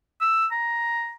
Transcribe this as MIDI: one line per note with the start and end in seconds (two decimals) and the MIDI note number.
0.21 0.46 88
0.51 1.13 82